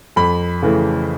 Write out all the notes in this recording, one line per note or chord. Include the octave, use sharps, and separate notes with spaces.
F2 B5
C#3 E3 A3